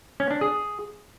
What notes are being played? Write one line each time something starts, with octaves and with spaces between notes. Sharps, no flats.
C#4
D4
G#4